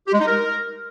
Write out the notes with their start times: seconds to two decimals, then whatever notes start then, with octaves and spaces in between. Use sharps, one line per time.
0.06 G4
0.13 G#3
0.19 D#4
0.26 A#4